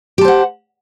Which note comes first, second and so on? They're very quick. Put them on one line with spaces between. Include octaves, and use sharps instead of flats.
G4 A5 C5 F#5